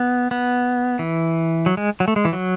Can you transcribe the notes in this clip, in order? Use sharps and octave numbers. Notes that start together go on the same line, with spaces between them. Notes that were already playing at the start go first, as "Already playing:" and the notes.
Already playing: B3
B3
E3
F#3
G#3
F#3
A3
G#3
E3
F#3